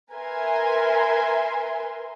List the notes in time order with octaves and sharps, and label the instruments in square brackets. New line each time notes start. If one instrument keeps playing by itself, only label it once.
[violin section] A#4 B4 E5 G#5 C6